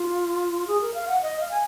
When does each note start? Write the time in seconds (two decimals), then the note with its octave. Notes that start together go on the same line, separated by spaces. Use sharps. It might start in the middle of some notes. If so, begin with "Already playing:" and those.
Already playing: F4
0.67 G#4
0.81 A#4
0.94 F5
1.08 F#5
1.22 D#5
1.40 F5
1.51 G#5